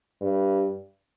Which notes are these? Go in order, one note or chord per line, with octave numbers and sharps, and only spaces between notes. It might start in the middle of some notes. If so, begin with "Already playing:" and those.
G2